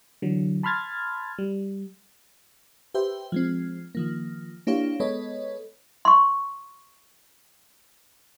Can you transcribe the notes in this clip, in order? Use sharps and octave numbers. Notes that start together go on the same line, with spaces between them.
D3 E3 F#3
A5 B5 C6 F6 G#6 A6
G3
G4 B4 C5 E5 G5
F3 G#3 C4
D#3 F3 A#3
A#3 D4 E4 G4 C#5 F5
G#3 B3 A4 B4 C#5 D#5
C6 C#6